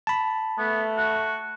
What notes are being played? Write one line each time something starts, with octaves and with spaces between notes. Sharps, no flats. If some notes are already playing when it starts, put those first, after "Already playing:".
A5 B5
A3 B3
F#4